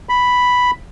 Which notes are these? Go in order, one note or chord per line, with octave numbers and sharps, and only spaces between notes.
B5